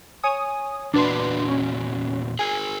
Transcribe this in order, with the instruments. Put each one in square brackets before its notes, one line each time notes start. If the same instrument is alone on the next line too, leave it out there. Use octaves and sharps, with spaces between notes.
[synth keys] C#5 G#5 D#6
[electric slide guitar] E2 A#2 F#4 [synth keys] D4 B4 C6
[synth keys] C#4
[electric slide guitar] G#4 A#4 [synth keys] G#5